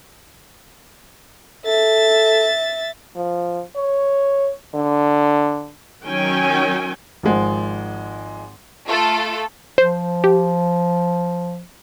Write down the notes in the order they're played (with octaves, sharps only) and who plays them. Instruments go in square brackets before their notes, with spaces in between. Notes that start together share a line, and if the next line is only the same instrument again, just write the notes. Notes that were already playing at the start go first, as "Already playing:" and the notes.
[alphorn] A4 [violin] E5 A6
[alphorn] F3
C#5
D3
[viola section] D#3 F#3 C#4 G5 G#5
[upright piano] G#1 F3 G#3 F#5
[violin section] A3 F4 A4
[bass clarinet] F3 [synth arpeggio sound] C5
[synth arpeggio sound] G4